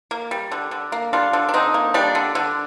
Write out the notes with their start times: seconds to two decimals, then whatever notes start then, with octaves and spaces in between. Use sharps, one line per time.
0.11 A#3
0.31 G3
0.52 D3
0.71 D3
0.92 A#3
1.13 G3 D4 F4
1.33 D3
1.49 D4
1.54 D3 C4 D#4
1.74 A#3
1.94 G3 D4
2.15 D3
2.35 D3